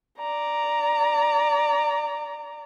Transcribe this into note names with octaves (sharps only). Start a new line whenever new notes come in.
D5 A#5